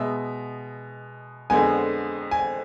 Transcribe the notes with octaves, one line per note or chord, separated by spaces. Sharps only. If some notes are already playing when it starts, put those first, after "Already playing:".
Already playing: B2 G#3 B3 E5
F2 D3 G#3 B3 G#5
G#5